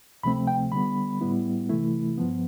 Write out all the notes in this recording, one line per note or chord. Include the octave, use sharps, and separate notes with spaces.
D2 C3 F3 A3 C4 B5
G5
D3 G3 B3 B5
A2 G3 B3 E4
C3 E3 A3 E4
G2 F3 B3